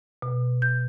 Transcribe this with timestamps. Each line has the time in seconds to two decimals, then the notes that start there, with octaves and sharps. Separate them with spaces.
0.22 B2
0.62 G6